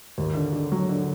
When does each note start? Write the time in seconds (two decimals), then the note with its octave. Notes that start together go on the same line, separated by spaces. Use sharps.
0.18 D#2
0.35 D3
0.53 D3
0.72 F#3
0.89 D3